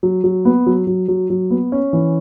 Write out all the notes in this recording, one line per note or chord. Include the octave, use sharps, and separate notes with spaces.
F#3
F#3
B3
F#3
F#3
F#3
F#3
B3
C#4
E3